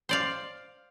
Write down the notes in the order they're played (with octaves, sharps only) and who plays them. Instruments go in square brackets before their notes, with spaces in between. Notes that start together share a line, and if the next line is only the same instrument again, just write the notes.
[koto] C5 D5 F5